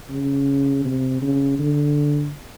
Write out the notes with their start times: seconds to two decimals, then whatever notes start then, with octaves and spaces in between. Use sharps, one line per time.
0.11 C#3
0.85 C3
1.22 C#3
1.59 D3